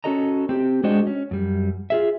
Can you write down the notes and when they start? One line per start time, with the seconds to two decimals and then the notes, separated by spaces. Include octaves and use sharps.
0.04 C#4 E4 F#4 A4 D#5 A#5
0.49 C4 G4
0.84 G#3 D4 F#4 C5 D#5 G5
1.07 C#4
1.31 F#2 G3
1.90 F4 G#4 E5